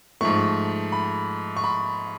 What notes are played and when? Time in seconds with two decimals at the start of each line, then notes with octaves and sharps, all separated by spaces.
0.21 G#2 F3 A3 C#6
0.92 B5
1.57 C#6
1.64 B5